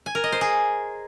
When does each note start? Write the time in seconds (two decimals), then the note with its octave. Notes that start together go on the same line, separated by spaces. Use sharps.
0.06 G#5
0.15 A#4
0.24 D#5
0.32 C5
0.41 G#4